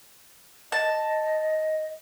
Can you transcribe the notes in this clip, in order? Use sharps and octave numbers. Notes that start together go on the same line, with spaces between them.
D#5 A5